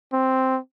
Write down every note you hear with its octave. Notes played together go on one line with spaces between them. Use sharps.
C4